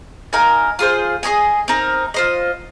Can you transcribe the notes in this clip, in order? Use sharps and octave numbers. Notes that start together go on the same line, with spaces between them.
D#4 A#4 F5 G#5
F4 G#4 C5
G#4 C5 D#5 G#5
C4 D#4 A#4
F4 C5 D#5